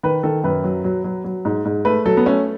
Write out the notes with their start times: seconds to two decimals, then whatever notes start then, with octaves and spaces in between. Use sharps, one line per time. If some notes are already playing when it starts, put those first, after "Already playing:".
0.03 D#3 B4
0.23 D#3 A4
0.43 F#2 B4
0.64 F#3
0.84 F#3
1.04 F#3
1.24 F#3
1.45 G#2
1.65 G#2
1.85 A3 B4
2.05 F#3 A4
2.17 B3
2.26 A3 C#4